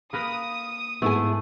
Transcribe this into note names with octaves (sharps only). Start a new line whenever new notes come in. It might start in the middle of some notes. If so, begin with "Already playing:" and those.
A#3 A#4 B4 D#6
G#2 A3 B3 E4 G#4